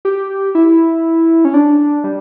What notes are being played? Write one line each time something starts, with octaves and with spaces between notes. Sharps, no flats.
G4
E4
C#4
D4
G3